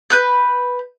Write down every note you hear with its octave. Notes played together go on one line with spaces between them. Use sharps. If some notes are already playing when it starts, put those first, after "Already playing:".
B4 F#6 G6